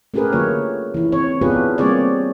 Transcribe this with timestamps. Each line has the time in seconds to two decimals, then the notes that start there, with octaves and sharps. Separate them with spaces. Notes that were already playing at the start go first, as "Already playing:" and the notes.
0.14 A3 C#4 G4 G#4 A#4 B4
0.33 D3 F#3 A#3 F4 C#5
0.94 E3 E4
1.12 C4 C#5
1.41 B3 D4 F4 G4 G#4 B4
1.78 G3 A#3 C4 G#4 C#5 D5